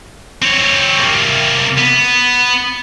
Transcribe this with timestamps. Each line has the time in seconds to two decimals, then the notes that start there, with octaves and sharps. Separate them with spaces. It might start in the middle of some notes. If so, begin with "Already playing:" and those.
0.42 C4 C#5
0.98 C3 A#3
1.78 B3